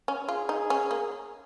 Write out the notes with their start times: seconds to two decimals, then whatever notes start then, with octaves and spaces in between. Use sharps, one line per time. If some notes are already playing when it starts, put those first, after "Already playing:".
0.08 C#4
0.28 F4 G#4
0.49 D#4
0.70 C#4
0.91 A#3